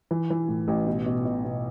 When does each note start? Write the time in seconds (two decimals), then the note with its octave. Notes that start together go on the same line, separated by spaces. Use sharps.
0.11 E3
0.30 E3
0.48 A2
0.68 A1
0.87 B2
1.06 B2
1.25 B2
1.44 B2